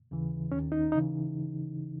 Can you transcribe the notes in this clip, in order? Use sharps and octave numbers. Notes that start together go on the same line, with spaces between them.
D#2 C#3 E3
D#2 D#3 C#4
D#4
C#3 E3 D#4